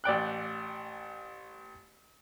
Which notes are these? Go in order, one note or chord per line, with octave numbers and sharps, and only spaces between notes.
A1 D5 G5 F#6